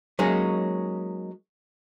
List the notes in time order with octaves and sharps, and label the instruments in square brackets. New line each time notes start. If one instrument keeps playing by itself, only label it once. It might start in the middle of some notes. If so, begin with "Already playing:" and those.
[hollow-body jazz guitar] F#3 G#3 A#3 C#4 D#4